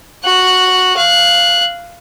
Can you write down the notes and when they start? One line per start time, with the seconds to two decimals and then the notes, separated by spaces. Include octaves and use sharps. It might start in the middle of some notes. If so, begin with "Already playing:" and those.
0.24 F#4 F#6
0.97 F5 F#6